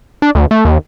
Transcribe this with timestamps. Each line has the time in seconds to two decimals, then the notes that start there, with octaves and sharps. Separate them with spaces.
0.22 D4
0.35 D2
0.51 A3
0.65 D#2